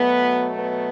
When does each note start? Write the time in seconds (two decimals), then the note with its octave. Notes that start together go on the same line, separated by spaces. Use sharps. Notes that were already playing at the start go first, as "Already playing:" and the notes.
Already playing: B2 F#3 A3 B3
0.58 B3